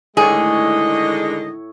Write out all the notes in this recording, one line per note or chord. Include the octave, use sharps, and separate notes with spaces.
A2 D3 D#3 G#3 G#4 C#5 D#5